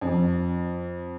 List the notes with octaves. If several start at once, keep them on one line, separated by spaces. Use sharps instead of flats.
F2